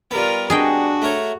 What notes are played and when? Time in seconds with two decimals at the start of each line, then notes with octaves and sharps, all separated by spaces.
0.11 G3 B3 F4 A#4
0.50 D4 F#4 G#4 D#5 G5
1.02 A3 A#4 C#5